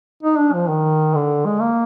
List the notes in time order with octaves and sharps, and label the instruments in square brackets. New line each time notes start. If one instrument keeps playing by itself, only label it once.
[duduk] D#4
D4
F3
D#3
D3
G#3
A#3